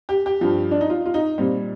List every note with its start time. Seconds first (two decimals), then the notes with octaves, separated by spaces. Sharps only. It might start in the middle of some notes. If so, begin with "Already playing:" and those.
0.09 G4
0.26 G4
0.41 G2 F3
0.71 D4
0.81 D#4
0.90 F4
1.06 F4
1.14 D#4
1.38 A#2 G3 C4